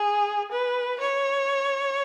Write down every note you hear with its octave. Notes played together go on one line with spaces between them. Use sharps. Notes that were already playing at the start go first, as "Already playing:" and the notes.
Already playing: G#4
B4
C#5